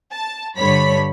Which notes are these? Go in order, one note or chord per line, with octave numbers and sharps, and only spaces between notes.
A5
G2 D3 C#5 B5 B6